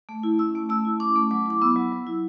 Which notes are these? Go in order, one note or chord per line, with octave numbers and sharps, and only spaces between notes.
A3
E4
C#4 E6
A3
A3 E6
E4
C#4 D6
A3
F#3 D6
E4 D6
B3 E6
F#3
F#3
E4